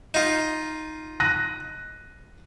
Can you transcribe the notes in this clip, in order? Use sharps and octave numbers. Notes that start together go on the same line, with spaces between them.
D#4 F4
F#6 A#6 D#7